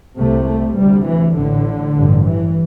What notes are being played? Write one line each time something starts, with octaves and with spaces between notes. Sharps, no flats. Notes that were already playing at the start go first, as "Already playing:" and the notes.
C2 C3 A3
A3
D2 C3 G3
E3
A1 A2 D3
A1 G2
E3